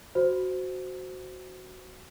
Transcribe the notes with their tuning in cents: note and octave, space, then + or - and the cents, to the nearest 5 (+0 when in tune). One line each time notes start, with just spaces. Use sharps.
F#4 +0 C5 -10